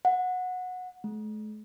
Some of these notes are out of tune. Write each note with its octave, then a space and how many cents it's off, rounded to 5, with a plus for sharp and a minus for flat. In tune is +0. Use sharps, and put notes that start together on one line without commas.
F#5 -15
A3 -45